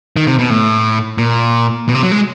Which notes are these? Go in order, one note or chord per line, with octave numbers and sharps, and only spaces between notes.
D#3
C3
B2
A2
A#2
B2
C3
F#3
G#3